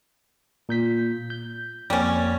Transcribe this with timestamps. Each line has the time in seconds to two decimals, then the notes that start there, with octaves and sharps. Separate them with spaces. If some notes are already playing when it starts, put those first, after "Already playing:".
0.69 A#2 G6 B6
1.30 G6
1.90 F2 G3 A#3 C#4 A6